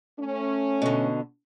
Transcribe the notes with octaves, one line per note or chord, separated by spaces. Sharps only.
A3 C#4
B2 D3